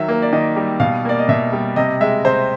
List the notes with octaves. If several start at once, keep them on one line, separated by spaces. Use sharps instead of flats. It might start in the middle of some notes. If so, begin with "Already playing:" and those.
Already playing: D#3 F#3 E5
A#3
D5
D#3 D#5
G3
B2 F5
A#3 D5
D#5
B2 E5
G3
C3 D#5
G#3 E5
C3 C5